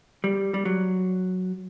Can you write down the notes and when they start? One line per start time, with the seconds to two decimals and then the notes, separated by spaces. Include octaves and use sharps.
0.24 G3
0.54 G3
0.65 F#3